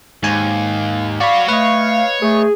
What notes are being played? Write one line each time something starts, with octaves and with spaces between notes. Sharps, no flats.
D#2 G#2 G#5
F#4 C#5 D5 F5 B5
A3 B4 C#5 D#5
A3 G#4